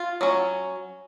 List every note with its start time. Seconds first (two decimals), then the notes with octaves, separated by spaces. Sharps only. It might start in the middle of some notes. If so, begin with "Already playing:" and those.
Already playing: F4
0.21 F#3 C#4